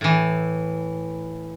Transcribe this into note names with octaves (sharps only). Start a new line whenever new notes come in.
A2 E3